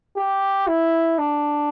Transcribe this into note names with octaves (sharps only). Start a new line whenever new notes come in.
G4
E4
D4